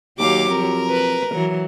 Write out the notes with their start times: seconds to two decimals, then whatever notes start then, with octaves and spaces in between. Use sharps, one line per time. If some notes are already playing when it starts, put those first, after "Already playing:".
0.19 D#2 F#3 G4 F5 D6
0.49 F2 A#4
0.90 B4
1.34 E3 F#3